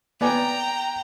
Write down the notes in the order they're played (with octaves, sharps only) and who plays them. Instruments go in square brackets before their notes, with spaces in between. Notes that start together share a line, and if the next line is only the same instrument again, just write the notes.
[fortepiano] B3 D5 G#5 [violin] G5 A#5